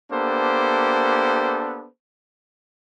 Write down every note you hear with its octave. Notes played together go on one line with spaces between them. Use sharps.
A#3 B3 D4 G4 A4 C5